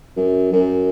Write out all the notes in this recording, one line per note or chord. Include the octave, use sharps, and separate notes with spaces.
F#2
F#2